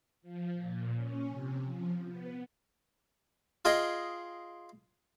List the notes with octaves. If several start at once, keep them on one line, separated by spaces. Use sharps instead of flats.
F3
A#2
C#4
C3
F3
B3
F4 G#4 D#5 G5